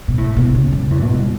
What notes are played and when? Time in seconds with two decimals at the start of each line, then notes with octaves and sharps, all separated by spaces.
0.08 B2
0.18 A2
0.37 B2
0.54 C#3
0.72 F#2
0.90 E2
1.03 B2
1.14 G3